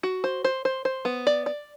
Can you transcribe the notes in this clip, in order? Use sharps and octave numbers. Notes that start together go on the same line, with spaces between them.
F#4
C5
C5
C5
C5
B3
D5
D5